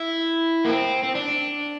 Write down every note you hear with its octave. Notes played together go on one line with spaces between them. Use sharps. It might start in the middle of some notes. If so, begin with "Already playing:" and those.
Already playing: E4
A#3
C4
C4
D4